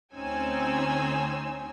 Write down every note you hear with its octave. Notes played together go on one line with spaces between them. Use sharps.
D2 C4 C#4 D#4 G#5 E6